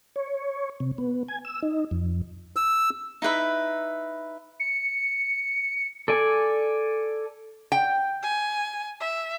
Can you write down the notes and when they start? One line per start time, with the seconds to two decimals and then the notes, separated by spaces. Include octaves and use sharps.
0.16 C#5
0.80 C3
0.98 B3
1.28 G#5
1.45 E6
1.62 D#4
1.91 F2
2.56 E6
3.22 D#4 E4 B4 E5
4.60 C#7
6.08 A4 D5 G#5
7.72 G5
8.23 G#5
9.00 E5